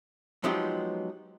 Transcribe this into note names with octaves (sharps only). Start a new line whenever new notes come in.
F3 F#3 G#3 B3 D#4 G4